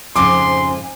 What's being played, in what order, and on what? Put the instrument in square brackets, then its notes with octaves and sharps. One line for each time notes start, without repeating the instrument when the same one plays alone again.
[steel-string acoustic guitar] F2 G#2 C#3 [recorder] G#5 [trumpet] C6 [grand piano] D6